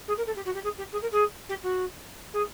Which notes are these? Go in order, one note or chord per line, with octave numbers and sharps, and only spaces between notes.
G#4
A#4
A4
G4
F#4
G4
G#4
G4
G#4
A#4
G#4
G4
F#4
G#4